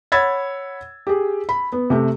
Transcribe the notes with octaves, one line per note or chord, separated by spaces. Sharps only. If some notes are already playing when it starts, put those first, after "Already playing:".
C#5 F#5 B5 E6 G#6 A6
G4 G#4
B5
B3
C3 A3 G4